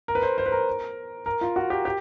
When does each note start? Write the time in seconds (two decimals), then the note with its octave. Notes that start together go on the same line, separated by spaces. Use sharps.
0.08 A#4
0.15 B4
0.22 C5
0.38 C5
0.46 B4
0.52 A#4
1.26 A#4
1.41 F4
1.56 F#4
1.70 G4
1.85 G4